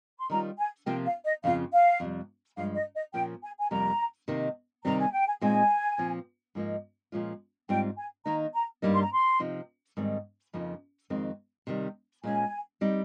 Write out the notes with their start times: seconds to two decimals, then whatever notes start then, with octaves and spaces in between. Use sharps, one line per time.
0.18 C6
0.30 D#3 G3 C#4 F4 A#5
0.58 G#5
0.86 C3 F3 A#3 F4 G5
1.06 F5
1.25 D#5
1.44 F2 C#3 F3 C4 F4 F5
1.72 F5
2.00 F2 C3 G3
2.57 G2 F3 G#3 F5
2.76 D#5
2.96 D#5
3.13 A#2 F3 A#3 C#4 G5
3.42 G#5
3.60 G#5
3.70 F2 C3 G3 A#3 A#5
4.28 C3 D#3 A#3 D#4
4.85 C3 D#3 G3 C4 A#5
4.99 G#5
5.12 G5
5.27 G#5
5.41 A#2 G#3 C4 D#4 G#5
5.98 A#2 F3 C4
6.55 G#2 F3 A#3 D#4
7.12 A#2 F3 G#3 C#4 F4
7.69 G#2 G3 C4 F4 G5
7.97 G#5
8.25 D#3 A#3 D#4 A#5
8.54 A#5
8.82 G2 G3 A#3 D#4
8.93 C6
9.03 A#5
9.13 C6
9.40 C3 F3 C4 D#4
9.97 G#2 D#3 G3 C4
10.53 F2 C#3 F3 A#3 D#4
11.10 F2 D#3 G#3 C4
11.67 C3 D#3 G3
12.24 A#2 G#3 C#4 G#5
12.81 G3 C4 D#4